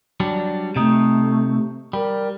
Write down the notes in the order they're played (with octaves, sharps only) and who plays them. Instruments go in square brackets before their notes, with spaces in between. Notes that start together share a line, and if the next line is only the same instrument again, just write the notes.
[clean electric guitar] F#3 G3 D4
[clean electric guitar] C3 D#4 [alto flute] A3
[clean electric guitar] G3 [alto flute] A#4